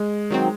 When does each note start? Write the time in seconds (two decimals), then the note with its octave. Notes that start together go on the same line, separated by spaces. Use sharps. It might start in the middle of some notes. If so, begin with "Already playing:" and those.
Already playing: G#3
0.30 D#3 F#3 C4